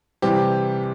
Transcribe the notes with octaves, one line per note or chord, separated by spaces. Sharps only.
C3 E3 G3 C4 G4